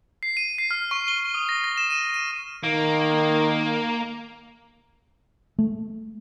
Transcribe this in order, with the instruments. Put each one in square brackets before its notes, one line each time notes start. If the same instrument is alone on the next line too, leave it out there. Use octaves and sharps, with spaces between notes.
[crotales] C7
D#7
C7
F6
C#6
G7
D#6
A#6
A#6
E7
D#7
D#7
[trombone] D#3 [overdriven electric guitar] A#3
[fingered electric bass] A3